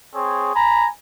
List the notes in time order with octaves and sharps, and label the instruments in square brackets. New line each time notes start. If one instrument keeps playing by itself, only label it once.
[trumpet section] C4 G#4 C#5
G#5 A#5 B5